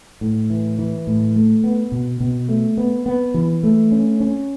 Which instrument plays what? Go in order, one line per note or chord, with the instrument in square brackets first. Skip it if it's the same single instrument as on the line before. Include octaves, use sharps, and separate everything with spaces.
[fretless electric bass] A2
E3
E3
A2
A3
B3
B2
B2
A3
B3
B3
E3
A3
C#4
C#4